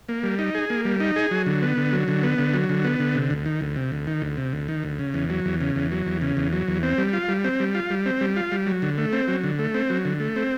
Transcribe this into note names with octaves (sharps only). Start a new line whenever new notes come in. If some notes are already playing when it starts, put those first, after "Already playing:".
A#3
G3
D#4
G#4
A#3
G3
D#4
G#4
F#3
D3
B3
D3
F#3
D3
B3
D3
F#3
D3
B3
D3
C3
D2
D#3
D2
C3
D2
D#3
D2
C3
D2
D#3
D2
C#3
E2
F#3
E2
C#3
E2
F#3
E2
C#3
E2
F#3
E2
C4
G3
F4
G3
C4
G3
F4
G3
C4
G3
F4
G3
F#3
D3
A3
C4
F#3
D3
A3
C4
F#3
D3
A3
C4